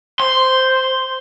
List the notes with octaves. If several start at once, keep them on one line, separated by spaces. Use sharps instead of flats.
C5 C6